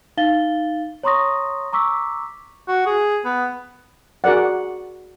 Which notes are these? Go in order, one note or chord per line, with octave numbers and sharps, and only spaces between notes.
D#4 F5 A6 G7
C#5 A#5 C6 C#6 D#6 A#6
A#5 C#6 D6 E6 B6
F#4
G#4
B3
F#4 G#4 A#4 D5 F#5